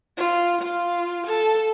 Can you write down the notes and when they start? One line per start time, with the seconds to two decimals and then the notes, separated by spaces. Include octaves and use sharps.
0.17 F4
0.61 F4
1.27 A4